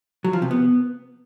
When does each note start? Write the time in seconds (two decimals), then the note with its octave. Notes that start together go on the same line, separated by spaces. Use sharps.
0.25 F#3
0.33 F3
0.42 C3
0.51 B3